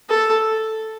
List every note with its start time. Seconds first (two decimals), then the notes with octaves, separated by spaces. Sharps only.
0.09 A4